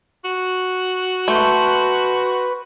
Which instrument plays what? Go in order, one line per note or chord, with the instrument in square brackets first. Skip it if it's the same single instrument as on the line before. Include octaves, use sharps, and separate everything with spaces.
[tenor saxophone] F#4
[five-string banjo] A3 [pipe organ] B4 [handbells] C6 C#6 G6